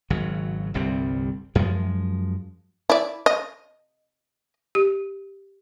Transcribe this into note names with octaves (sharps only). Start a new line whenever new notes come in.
G#1 C#3 F#3
G1 C2 G3 C4
F#2 F3 G#3
E4 D5
D#5
G4